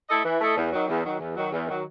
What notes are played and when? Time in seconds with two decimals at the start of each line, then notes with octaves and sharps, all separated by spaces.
0.09 A3 E4 A4 D#5
0.25 E3
0.41 A3 E4 A4 D#5
0.56 E2
0.72 D#3 F#3
0.88 E2
1.05 D#3 F#3
1.20 E2
1.35 D#3 F#3
1.52 E2
1.67 D#3 F#3